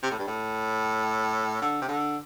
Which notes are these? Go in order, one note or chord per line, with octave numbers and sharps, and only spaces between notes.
C3
A2
G2
A2
D3
C3
D3